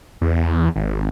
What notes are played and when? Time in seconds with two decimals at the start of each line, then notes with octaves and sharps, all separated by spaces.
0.21 E2
0.76 G#1